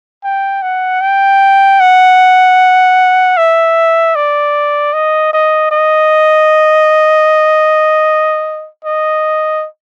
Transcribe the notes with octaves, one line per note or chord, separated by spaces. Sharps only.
G5
F#5
G5
F#5
E5
D5
D#5
D#5
D#5
D#5